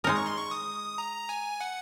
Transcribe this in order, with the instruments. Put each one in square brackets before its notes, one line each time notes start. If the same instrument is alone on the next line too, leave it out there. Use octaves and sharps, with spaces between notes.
[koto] G#3 D#4 A#4 [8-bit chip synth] D#6
[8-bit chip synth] C#6
C6
C#6
D#6
A#5
G#5
F#5